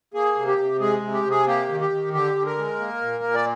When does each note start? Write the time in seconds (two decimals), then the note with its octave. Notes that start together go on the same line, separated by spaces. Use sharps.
0.14 A#3 G#4
0.35 C3
0.47 G4
0.58 C3
0.80 G#3 G#4
1.02 C3
1.14 G4
1.24 C3
1.30 G#4
1.47 A#3 G4
1.68 D#3
1.80 G4
1.90 D#3
2.13 D3 G4
2.35 D3
2.46 A#4
2.57 G#3
2.79 A#3
3.02 A#2
3.24 A#2
3.35 D5